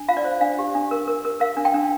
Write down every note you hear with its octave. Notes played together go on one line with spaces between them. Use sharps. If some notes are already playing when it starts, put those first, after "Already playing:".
Already playing: D4
F4 F5
D5
C5
D4 F5
G4
D4
A#4
A#4
A#4
A#4 F5
D4
G5
D4